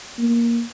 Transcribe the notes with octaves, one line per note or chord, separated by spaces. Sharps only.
A#3